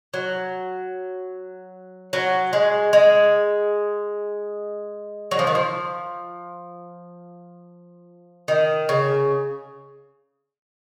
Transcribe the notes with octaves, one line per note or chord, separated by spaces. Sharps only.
F#3
F#3
G#3
G#3
F#3
F3
D#3
F3
D#3
C#3